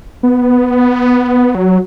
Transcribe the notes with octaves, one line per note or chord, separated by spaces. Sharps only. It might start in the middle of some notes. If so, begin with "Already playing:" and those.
B3
F#3